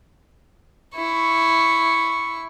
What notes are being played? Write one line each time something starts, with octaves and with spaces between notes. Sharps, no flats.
E4 C#6